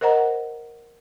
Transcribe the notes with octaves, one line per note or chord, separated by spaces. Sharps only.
A#4 C5 D#5 F#5 A#5